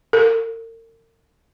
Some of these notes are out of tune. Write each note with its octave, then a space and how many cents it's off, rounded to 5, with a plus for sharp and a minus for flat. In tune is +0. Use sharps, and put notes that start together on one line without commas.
A#4 -45